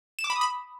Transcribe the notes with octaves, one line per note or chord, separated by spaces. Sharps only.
E7
D6
B5
D#6
B5